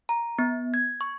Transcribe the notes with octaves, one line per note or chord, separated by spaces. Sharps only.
A#5
B3
G#6
C#6